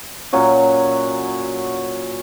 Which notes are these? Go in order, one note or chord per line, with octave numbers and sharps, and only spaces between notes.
A#2 F#3 C#4 F#4